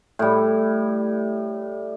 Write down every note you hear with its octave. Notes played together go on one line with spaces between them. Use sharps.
A2 G3